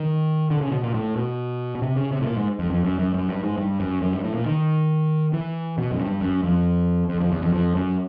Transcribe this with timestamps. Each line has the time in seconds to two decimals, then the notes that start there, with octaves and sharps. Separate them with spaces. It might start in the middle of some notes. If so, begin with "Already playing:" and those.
Already playing: D#3
0.50 D3
0.61 C#3
0.72 B2
0.83 A#2
0.94 A2
1.16 B2
1.75 B2
1.82 C3
1.97 C#3
2.12 C3
2.21 A2
2.26 A#2
2.37 G#2
2.59 F2
2.70 F2
2.85 F#2
2.99 F#2
3.14 F#2
3.28 G2
3.43 G#2
3.58 G2
3.80 F#2
4.02 F#2
4.12 G2
4.24 A2
4.35 A#2
4.46 D#3
5.33 E3
5.78 B2
5.91 F#2
6.00 G2
6.21 F#2
6.43 F2
7.09 F2
7.20 F2
7.32 E2
7.42 F2
7.53 F2
7.75 F#2